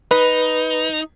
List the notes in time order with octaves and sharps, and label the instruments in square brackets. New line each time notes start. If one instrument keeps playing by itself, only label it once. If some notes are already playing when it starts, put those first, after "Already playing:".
[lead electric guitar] D#4 [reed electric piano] B4